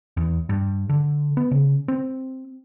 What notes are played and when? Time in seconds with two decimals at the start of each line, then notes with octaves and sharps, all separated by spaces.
0.17 E2
0.49 G2
0.89 D3
1.37 B3
1.51 C#3
1.88 C4